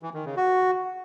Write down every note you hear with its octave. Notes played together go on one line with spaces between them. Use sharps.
E3
D#3
C#3
F#4